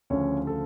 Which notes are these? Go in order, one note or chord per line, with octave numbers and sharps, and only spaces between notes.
D2 C#3 F3 C#4 C#5
A4